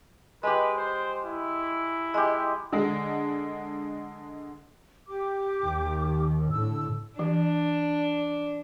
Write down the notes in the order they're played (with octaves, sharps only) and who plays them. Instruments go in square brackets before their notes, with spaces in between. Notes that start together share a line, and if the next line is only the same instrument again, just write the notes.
[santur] G#3 G4 [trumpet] B4
[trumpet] C5
E4
[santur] G#3 G4
[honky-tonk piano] D3 G#3
[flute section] G4 D6
[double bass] D#2 D#3
[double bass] A2 D3 [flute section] E6
[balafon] E3 [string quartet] D4